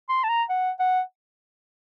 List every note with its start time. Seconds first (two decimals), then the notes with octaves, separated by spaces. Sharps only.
0.09 C6
0.24 A5
0.29 A#5
0.49 F#5
0.79 F#5